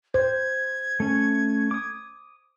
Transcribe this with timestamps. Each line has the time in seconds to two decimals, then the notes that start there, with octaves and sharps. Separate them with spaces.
0.14 C5 G#6
1.00 A3 C#4
1.71 D6 D#6